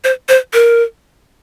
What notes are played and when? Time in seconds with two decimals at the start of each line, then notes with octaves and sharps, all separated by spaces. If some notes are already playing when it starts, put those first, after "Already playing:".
0.04 C5
0.29 C5
0.53 A#4